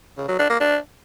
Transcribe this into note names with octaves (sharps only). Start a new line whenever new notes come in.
C#3
F#3
D4
A#3
D4